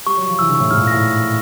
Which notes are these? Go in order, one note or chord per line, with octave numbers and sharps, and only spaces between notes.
G3 C#6
F#3
C#6
F3
E3 E6
D3
C#6
A2
G#2 F6
A#2
A2
A#6
A2